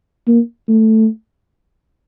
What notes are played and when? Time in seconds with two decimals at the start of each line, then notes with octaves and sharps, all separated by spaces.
0.27 A#3
0.68 A3